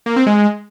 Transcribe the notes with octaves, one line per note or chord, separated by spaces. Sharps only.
A#3
C4
G#3